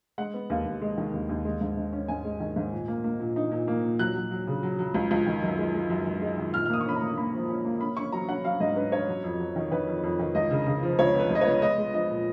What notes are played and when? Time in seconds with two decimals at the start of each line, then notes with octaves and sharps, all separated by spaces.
0.18 G#3 F#5
0.34 B3
0.50 D#2 F5
0.66 D#2
0.81 G#3
0.97 D#3
1.14 D#2
1.29 D#2
1.45 G#3
1.61 G#2
1.77 G#2
1.93 C#4
2.08 G#2 G#5
2.24 G#3
2.40 D#3
2.56 G#2
2.72 A#2
2.88 A#3
3.04 A#3
3.20 A#2
3.36 D#4
3.51 A#2
3.68 A#3
3.83 A#2
3.99 F#3 F#6
4.15 F#3
4.31 F#3
4.47 C#3
4.63 F#3
4.79 F#3
4.94 C#2
5.11 C#2
5.26 D#3
5.42 F#2
5.58 G#3
5.74 G#3
5.90 F#2
6.06 D#3
6.22 G#3
6.38 D#3
6.54 A#2 F6
6.66 F6
6.70 A#3 D#6
6.81 C#6
6.85 C#4 B5
6.96 A#5
7.02 A#3
7.17 A#3 B5
7.33 F3
7.49 C#4
7.65 A#3
7.81 C#4 B5
7.97 C#4 C#6
8.12 F#3 A#5
8.29 C#4 F#5
8.44 F#3 F5
8.60 G#2 D#5
8.76 C#4 B4
8.92 C#4 C#5
9.08 F#3
9.24 F2
9.39 F#3
9.56 D#3
9.72 D#3 B4
9.87 F2
10.03 F2
10.19 D#3
10.35 C#2 D#5
10.51 C#3
10.67 C#3
10.83 F3
10.99 C#2 C#5
11.14 B3
11.20 B4
11.31 C#2 D#5
11.41 C#5
11.47 B3
11.62 G#3 D#5
11.78 G#3
11.94 F3 D#5
12.10 A#2